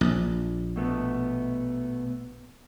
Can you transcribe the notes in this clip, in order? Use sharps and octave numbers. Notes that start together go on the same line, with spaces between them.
A#1
B2 A3 B3